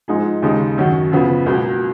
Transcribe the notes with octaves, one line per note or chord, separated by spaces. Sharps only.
G#2 F3 G#3 D#4 G#4
D#2 C#3 G#3 D#4
F#2 D#3 F#3 C#4 F#4
F#2 C#3 F3 B3
C#2 B2 F#3 A#3